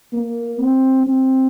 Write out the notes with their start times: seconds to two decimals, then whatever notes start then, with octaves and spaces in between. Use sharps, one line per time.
0.13 A#3
0.59 C4
1.03 C4